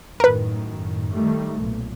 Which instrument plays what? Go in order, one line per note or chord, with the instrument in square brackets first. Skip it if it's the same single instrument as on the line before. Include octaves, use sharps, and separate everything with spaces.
[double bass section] F#2 A2 D#3 [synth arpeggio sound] A#4 B4
[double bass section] D#3 G3 A3
B1 A#2